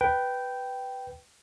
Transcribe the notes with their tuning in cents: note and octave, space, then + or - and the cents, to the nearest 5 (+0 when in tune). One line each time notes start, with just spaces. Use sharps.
B4 +0 G5 -10